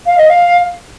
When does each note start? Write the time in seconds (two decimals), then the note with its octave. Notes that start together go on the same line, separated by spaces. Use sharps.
0.06 F5
0.18 D#5
0.29 F5